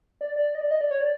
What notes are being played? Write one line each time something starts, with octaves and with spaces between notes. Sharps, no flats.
D5
D5
D#5
D5
D#5
D5
C#5
D5